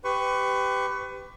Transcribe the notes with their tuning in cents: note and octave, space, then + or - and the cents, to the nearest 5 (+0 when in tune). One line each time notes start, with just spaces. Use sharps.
G4 +0 B4 +30 C#6 +0